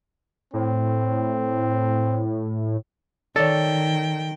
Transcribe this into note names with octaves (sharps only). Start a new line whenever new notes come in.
A2 C4
D#3 A4 C#5 D5 G5